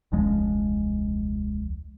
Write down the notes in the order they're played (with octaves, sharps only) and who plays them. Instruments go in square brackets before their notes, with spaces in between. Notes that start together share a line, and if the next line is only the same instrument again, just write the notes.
[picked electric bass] E1 C#2 F3 G#3